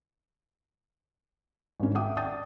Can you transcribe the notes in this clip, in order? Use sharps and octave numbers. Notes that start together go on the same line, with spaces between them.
G#1 C#4
E5 F#5 G5 D6 D#6
D5 G5 A5 D#6 G6 A6